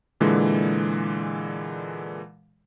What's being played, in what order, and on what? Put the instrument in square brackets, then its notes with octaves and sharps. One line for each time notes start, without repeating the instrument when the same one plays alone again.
[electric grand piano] A#2 D3 E3 G#3